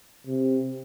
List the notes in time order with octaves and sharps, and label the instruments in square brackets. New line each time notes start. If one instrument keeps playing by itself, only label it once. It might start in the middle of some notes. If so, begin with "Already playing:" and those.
[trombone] C3